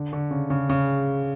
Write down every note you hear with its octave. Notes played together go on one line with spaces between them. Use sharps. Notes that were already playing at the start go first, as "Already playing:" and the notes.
Already playing: D3
D3
C#3
C#3
C#3